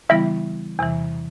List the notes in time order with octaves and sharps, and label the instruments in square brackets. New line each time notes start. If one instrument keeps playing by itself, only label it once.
[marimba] C#3 E3 G3 B3 E4 [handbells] E5
[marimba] E2 C3 E3